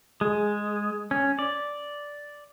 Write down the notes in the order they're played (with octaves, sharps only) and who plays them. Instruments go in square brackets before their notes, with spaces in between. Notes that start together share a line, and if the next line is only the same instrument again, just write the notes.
[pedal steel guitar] G#3
C#4
D5